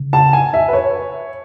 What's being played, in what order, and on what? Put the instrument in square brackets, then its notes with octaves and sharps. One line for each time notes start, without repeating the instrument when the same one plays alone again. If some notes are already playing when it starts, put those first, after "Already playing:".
Already playing: [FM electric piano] C#3
[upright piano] A5
G#5
E5
B4
C#5